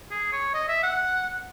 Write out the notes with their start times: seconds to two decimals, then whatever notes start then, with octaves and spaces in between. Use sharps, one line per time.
0.11 G#4
0.32 C#5
0.54 D#5
0.68 E5
0.83 F#5